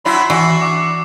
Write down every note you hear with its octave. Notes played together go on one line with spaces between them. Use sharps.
F#3 D4 E4 B5 C6
E3 D4 F#4 C#6 E6 C7
D6